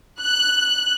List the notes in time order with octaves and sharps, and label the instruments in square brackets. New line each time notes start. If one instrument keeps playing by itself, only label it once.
[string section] F#6